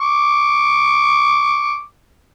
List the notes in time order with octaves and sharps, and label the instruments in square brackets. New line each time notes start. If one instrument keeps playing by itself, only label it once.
[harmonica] C#6 D6